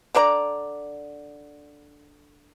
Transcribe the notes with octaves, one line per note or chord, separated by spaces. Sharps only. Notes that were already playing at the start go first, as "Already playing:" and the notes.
D3 D4 D5 A#5